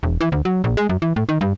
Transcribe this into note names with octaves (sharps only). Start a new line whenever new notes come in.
E1
E3
D2
F#3
A#1
G#3
F#2
E3
A2
D#3
G2